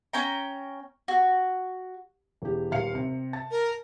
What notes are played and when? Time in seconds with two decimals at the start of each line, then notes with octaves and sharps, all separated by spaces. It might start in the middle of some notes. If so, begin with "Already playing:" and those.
0.13 C#4 G5 A#5
1.08 F#4
2.42 E1 G4
2.71 D#1 F5 C#7
2.95 C3
3.33 A5 A6
3.51 A#4